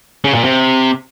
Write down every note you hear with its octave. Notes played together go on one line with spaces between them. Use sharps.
C#3
A#2
C3